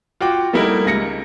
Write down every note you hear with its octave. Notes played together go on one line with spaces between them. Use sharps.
F4 F#4 G5 D6
G3 A3 A#3 D#4 E4 A#4
C#2 A#6 C#7